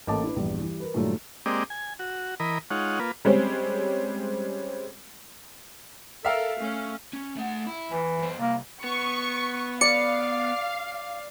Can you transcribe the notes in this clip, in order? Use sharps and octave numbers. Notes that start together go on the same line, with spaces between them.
A1 A#3 A4 D#5 A5 D6
D4 E4 B4
A#1 E2 G2
E3 G3
A#4 B4
G2 A#2 D#3 F#3 A3 F4
G#3 A#3 C4 G4 D5 D#5
G#5
F#4
E3 A#4 D#5 B5
G#3 D#4 F4 C#5 F#5
A#3 F4 B4
G3 G#3 C4 C#4
A4 A#4 E5 F5
A3 C#4
C#4
A3 F#5
E4
E2 E3
F#2 C5
C2 A#3
B3 C#6
D5 F5 C#7